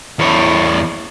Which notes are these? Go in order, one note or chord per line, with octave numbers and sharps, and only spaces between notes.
E2 C#5